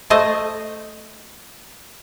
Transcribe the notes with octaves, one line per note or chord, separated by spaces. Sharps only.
A3 C5 D#5